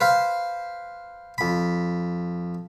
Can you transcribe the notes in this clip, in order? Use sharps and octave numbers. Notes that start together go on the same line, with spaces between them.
B4 C5 F5
F2 B5